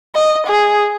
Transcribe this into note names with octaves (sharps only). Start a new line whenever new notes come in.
D#5
G#4